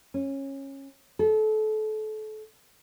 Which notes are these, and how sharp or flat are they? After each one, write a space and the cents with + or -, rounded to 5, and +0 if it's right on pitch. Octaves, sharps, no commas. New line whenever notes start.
C#4 -20
A4 -30